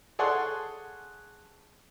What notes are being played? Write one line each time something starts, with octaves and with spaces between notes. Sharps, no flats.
G#4 A4 C#5 D5 F#5 C6